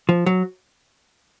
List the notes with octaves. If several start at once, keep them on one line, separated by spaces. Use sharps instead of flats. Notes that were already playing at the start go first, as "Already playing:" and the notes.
F3
F#3